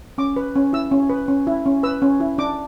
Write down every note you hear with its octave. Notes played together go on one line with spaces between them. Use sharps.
C#4 D6
B4
C#4
E4 E6
C#4
B4
C#4
E4
C#4
B4 E6
C#4
E4
D4 D6